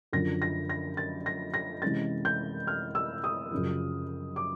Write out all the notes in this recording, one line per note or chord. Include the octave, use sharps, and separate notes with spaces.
F#2 D3 F3 A#6
A#6
A#6
A6
A#6
A#6
C3 E3 G#3 C#4 A6
G6
F6
E6
D#6
F#2 C#3 F3
D6